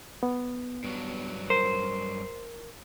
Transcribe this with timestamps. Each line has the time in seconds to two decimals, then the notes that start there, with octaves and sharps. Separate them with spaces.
0.23 B3
0.84 G2 F#3
1.50 A#4 C5